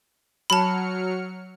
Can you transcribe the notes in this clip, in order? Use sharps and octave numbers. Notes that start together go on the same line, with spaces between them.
F#3 A5 B5 F6 C#7